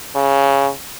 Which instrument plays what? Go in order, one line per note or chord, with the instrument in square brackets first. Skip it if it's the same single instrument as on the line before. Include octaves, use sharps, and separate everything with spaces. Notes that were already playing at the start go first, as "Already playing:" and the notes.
[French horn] C#3